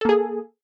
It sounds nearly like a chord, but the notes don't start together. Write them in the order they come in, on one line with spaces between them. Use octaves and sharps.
A4 A#3 G#4